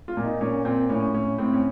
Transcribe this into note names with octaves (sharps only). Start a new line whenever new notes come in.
F4
A#2
D#4
A#2 C#4
A#2 C4
A2 C#4
A2 C#4
A2 C4
C#4